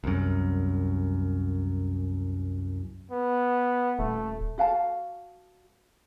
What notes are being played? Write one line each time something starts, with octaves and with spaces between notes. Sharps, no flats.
C2 F#2
B3
D#1 A3
F#4 F5 G#5 A5